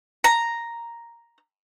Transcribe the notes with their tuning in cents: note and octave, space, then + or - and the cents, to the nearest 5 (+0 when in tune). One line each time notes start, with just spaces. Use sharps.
A#5 +0